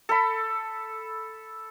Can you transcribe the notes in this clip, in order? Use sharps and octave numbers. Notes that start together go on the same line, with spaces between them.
A4 B5